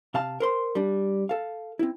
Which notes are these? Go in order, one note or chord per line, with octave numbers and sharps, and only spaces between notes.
C3 F5 A5
A#4 C5 C6
G3 D4
A4 F5
C4 E4